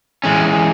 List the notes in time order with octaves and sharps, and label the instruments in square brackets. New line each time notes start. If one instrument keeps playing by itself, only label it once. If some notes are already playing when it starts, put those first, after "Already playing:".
[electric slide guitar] E3 G#3 C#4